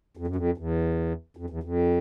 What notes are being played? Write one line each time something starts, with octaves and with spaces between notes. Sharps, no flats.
F2
F#2
F2
E2
F2
E2
F2